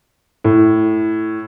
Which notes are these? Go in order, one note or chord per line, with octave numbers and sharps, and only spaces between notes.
A2